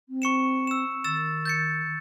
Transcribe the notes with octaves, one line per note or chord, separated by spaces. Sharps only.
C4
C#6 C#7 E7
E6 E7
D#3 E6 A6 E7
G6 A6 C#7